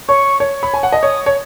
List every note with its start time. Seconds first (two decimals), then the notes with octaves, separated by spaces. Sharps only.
0.08 C#5 C#6
0.40 C#5
0.63 B5
0.74 G#5
0.83 F#5
0.92 D#5
1.02 C#5 D#6
1.26 C#5